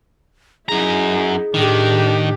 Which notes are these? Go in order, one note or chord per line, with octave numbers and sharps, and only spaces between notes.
F#2 D#4 E4 G#4 A#5
A2 D#3 D4 G4